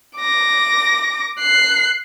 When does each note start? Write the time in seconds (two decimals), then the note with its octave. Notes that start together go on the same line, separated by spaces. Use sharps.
0.18 D6 A#6
1.39 F#6 C7